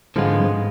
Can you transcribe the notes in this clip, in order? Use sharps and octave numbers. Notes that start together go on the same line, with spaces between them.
G#2 D3 F3 G#3 B3 F4
G#2